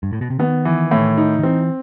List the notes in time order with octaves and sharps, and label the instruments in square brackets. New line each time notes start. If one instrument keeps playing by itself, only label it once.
[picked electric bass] G2
A2
B2
C3
[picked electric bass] D#3 [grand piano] B3
[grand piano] E3
A2
D#4
[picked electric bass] D#3
[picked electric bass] E3 [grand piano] C4